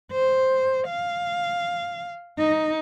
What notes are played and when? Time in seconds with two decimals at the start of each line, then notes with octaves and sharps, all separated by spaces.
0.12 C5
0.87 F5
2.39 D#4